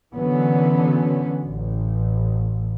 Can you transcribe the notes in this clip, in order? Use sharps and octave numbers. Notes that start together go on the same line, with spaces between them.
D3 E3 F#3 B3 C#4
A1